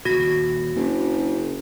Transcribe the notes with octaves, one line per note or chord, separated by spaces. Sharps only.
D#2 A#2 F#4 A#6
F#1 D4